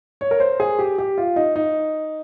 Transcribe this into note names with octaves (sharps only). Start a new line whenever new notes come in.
C#5
A#4
C5
G#4
G4
G4
F4
D#4
D#4